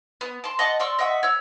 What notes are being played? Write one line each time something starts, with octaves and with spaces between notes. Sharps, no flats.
B3
A5 C6
D#5 F#5 A5 C#6
D5 C6 C#6 E6
D#5 E5 F#5 C#6
C#5 E6